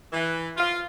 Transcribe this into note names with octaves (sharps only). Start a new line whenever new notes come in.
E3
F4